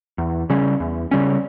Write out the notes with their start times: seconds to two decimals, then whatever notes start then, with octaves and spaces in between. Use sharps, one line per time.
0.18 E2
0.50 C#3 G3 C#4
0.80 E2
1.11 C#3 G3 C#4